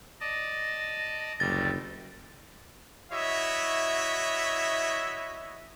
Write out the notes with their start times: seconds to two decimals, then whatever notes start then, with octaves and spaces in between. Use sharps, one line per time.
0.21 D5 D#5 A5 A#6
1.40 F#1 D2 G3 A6
3.12 E4 F#4 C#5 D#5 E5